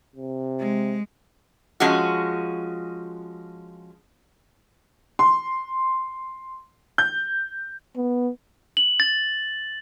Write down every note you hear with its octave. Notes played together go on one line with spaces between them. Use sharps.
C3
G#3
F3 G#3 C#4 F#4
C6
G6
B3
F#7
A6